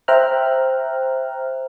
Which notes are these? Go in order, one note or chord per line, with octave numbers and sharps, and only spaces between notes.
C5 E5 G5 A#5 F6 F#6